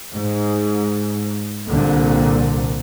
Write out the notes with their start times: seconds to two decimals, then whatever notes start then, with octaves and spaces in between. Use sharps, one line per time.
0.12 G#2
1.68 C2 A#2 D3